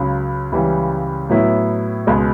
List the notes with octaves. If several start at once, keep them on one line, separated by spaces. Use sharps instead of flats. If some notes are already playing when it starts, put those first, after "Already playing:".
Already playing: C#2 C#3 F#3
C#2 C#3 E3 G3
A2 F#3 B3 E4
C#2 B2 G#3